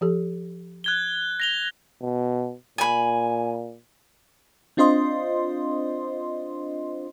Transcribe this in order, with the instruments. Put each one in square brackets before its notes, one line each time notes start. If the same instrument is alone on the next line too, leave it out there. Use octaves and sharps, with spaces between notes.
[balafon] F3 G4 A4
[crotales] F#6 G#6 G7
A#6 F7 G7
[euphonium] B2
[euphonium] A#2 [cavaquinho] G#5 B5
[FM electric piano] C4 D4 F4 C5 D#5 C6